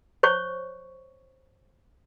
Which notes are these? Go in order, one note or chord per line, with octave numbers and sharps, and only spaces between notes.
C5 C#5 C#6